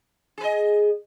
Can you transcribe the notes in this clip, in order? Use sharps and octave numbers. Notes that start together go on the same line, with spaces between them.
G#4 B4 D#5